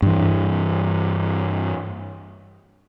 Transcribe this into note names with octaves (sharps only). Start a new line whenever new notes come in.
G2 E3